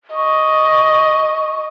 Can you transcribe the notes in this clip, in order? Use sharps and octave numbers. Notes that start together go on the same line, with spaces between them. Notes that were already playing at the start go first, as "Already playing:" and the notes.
D#5 C#6